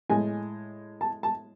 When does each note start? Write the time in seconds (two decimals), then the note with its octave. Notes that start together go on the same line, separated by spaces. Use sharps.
0.09 A2 G#3 G#5
1.01 A5
1.23 A5